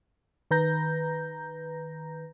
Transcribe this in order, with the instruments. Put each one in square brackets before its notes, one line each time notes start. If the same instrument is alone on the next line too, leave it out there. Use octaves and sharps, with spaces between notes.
[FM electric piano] D#3 B4 A#5 G6 A#6